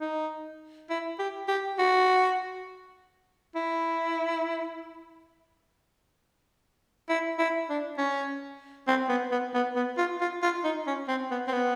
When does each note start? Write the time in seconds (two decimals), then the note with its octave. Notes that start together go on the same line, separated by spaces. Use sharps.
0.01 D#4
0.90 E4
1.19 G4
1.48 G4
1.79 F#4
3.55 E4
7.09 E4
7.39 E4
7.69 D4
7.98 C#4
8.88 C4
9.09 B3
9.31 B3
9.54 B3
9.76 B3
9.98 F4
10.21 F4
10.43 F4
10.64 D#4
10.87 C#4
11.08 C4
11.31 B3
11.47 C4
11.52 B3